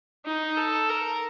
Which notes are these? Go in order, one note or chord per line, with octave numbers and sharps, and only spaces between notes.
D#4
A4
A#4